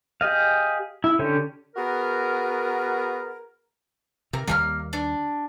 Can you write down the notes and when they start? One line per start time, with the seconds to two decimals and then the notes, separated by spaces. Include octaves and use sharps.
0.21 G4 G#4 D#5 F5
1.04 E4
1.19 D3 C#4 G4 C#5
1.76 B3 F#4 G#4 A#4
4.33 C3 A#4
4.48 D#2 D#3 G3 A#3 A#5 F6
4.93 D4